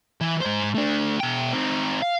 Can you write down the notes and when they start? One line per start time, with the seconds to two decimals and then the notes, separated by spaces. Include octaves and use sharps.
0.21 E3
0.41 G#2 C5
0.75 A3 D4
1.20 B2 G5
1.53 C4 D#4
2.02 F5